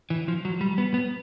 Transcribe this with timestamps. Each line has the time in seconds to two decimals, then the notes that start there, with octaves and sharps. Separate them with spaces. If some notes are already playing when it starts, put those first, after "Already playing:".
0.10 E3
0.28 F3
0.45 F#3
0.61 G3
0.78 B3
0.94 B3